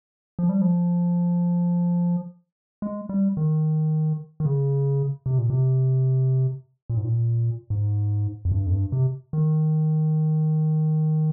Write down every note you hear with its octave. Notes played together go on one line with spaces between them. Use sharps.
F3
G3
F3
G#3
G3
D#3
D#3
C#3
C3
A#2
C3
A#2
G#2
A#2
G#2
F2
G2
F2
G2
C3
D#3